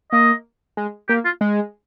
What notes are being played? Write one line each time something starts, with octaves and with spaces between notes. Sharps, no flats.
A#3 D#5
G#3
A#3 G4
F4
G#3